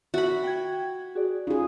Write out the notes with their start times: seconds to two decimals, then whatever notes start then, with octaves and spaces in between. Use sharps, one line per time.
0.14 F#4 E5 B5
0.44 G5 G#6
1.15 F#4 G#4 D5
1.47 C#4 D#4 F4 G#4